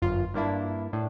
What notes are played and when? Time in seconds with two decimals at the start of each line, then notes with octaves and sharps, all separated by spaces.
0.02 G1 F#2 F4
0.34 G2 A#3 D4 E4
0.93 A2 D4